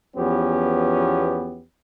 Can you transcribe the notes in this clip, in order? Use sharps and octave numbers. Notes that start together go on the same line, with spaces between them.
E2 F3 B3 C#4 G4